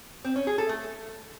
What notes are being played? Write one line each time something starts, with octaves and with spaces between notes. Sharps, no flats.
C4
C#4
G#4
A4
A3